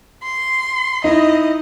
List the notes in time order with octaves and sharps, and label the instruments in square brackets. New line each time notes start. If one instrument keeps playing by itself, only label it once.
[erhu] C6
[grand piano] D#4 E4 [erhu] D#5